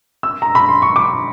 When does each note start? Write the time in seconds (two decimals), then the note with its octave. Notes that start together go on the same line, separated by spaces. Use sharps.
0.23 E6
0.42 A#5
0.55 B5
0.69 C6
0.82 C#6
0.96 D6